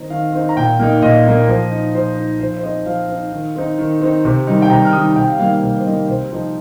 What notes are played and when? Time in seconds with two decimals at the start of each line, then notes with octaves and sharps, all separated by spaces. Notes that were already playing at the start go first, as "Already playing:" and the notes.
Already playing: D#3 C4 D#4 D#5
0.10 D#3 F5
0.33 C4 D#4
0.49 A#5
0.56 A#2 G5
0.79 A#3 D#4
1.02 A#2 D#5
1.25 A#3 D#4
1.48 F3
1.71 D#4
1.94 F3 C5
2.17 D#4
2.40 F3 C5
2.57 C5
2.63 C4 D#4 D#5
2.86 F3 F5
3.10 C4 D#4
3.33 D#3
3.56 C4 D#4
3.79 D#3
4.01 C4 D#4
4.25 C3
4.47 D#3 G3 D#4
4.62 G5
4.70 C3 A#5
4.85 F6
4.93 D#3 G3 D#4 D#6
5.16 C3 G5
5.28 F5
5.39 D#3 G3 A#3 D#4 F5
5.51 F5
5.62 C3 F5
5.77 C5
5.85 D#3 G3 A#3 D#4 D#5
6.08 C3 C5
6.32 F3 C4 D#4